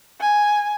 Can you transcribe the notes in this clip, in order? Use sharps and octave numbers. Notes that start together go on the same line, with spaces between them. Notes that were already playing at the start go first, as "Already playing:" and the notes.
G#5